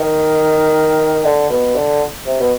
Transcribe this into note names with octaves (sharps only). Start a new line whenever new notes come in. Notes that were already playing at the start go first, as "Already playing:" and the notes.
Already playing: D#3
D3
B2
D3
C3
B2